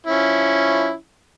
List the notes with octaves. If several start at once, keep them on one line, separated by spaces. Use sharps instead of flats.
F3 C#4 E4